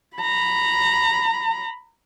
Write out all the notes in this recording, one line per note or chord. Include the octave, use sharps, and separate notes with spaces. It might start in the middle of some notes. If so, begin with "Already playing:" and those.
A#5 B5